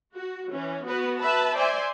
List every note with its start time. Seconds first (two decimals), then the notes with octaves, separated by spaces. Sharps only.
0.13 F#4
0.49 E3 C#4
0.86 B3 F#4 B4
1.19 B4 E5 A5 B5
1.55 C5 D5 E5 G#5 C6